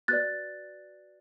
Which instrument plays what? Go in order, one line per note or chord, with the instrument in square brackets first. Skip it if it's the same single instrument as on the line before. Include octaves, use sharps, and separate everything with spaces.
[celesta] F#4 B4 D5 F#6 A6